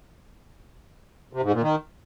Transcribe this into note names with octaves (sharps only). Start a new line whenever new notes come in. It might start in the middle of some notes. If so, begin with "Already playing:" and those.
C3
G#2
A#2
D#3